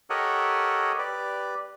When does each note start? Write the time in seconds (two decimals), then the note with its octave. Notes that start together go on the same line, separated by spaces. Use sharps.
0.10 G4 A4 A#4 C#5 D#5 F#5
0.99 G4 B4 D5